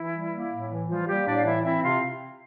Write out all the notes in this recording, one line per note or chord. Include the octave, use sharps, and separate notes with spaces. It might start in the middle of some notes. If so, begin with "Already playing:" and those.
Already playing: E3 E4
G3
A#3
A2
E3
F3 G3 F4
G3 A#3 G4
A2 D4 D5
F5
E3 E4 E5
C4 E4 E5
C3 F4 F5